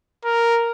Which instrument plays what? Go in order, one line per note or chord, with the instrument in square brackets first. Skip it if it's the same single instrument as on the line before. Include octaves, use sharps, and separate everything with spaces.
[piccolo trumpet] A#4